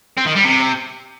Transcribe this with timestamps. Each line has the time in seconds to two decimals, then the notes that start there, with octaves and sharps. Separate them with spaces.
0.18 C4
0.27 D#3
0.36 G3
0.45 C3